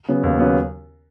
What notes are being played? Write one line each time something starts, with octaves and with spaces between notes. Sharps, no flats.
C#3 F#3 B3
D#2
C#3 F#3 B3